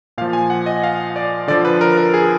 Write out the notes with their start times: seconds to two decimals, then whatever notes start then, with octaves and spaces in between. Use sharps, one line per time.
0.18 A#2 F5
0.21 F3
0.33 G#5
0.50 F#5
0.66 D#5
0.83 F5
1.16 D5
1.48 D3 F3 D5
1.65 B4
1.81 A#4
1.97 A#4
2.14 G#4